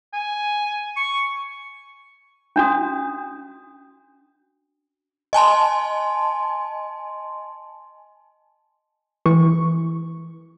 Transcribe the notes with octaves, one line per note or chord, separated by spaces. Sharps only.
G#5
C#6
C#4 D4 F#4 D#6
D#5 G#5 A5 C6
E3 C#6